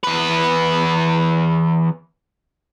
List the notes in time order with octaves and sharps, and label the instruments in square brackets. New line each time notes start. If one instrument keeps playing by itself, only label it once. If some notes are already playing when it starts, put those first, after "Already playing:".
[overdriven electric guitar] E2 B4